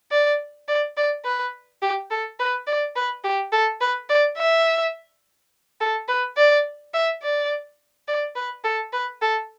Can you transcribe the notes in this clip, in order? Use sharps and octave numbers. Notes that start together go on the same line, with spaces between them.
D5
D5
D5
B4
G4
A4
B4
D5
B4
G4
A4
B4
D5
E5
A4
B4
D5
E5
D5
D5
B4
A4
B4
A4